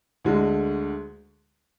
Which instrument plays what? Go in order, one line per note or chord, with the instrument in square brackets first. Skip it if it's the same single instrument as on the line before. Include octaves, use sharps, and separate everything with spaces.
[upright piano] D2 D3 G#3